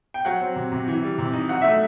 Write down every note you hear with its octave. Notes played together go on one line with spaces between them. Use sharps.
G5
F#3 F#5
C4
C3
C3
E3
G3
C3
D#4
F#3 F#5
A3 E5